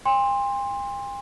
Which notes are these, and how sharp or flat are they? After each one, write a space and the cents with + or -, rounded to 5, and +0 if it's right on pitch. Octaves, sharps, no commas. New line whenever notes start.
G5 +45 C6 +10